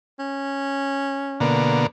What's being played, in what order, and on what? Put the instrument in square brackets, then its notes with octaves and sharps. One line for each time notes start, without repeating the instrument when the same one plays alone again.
[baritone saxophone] C#4
[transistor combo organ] B2 D3 A#3